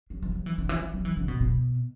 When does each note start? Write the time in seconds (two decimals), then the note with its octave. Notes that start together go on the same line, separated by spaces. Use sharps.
0.10 F#3
0.22 E3
0.34 F#3
0.46 E3
0.58 D3
0.69 E3
0.81 F#3
0.94 F#3
1.05 E3
1.17 D3
1.28 B2
1.40 B2